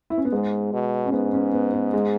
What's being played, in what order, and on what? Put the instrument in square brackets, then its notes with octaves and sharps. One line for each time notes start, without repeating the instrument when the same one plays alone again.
[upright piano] E4
C#4
B3
[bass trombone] G#2 [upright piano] G#3
[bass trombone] B2
[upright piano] C#4
[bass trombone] G#2 [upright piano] B3
[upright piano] C#4
B3
B3
G#3